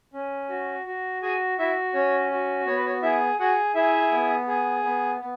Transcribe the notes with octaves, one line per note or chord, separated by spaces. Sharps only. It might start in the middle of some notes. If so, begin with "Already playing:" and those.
C#4
F#4
F#4
F#4 G#4 G#5
E4 F#4 E5
C#4 C#5
F#4
B3 C#5
B4
C#5
E4 G#4 E5
F#4 G#4 F#5
E4 G#4 E5
B3
G#4
B3
B3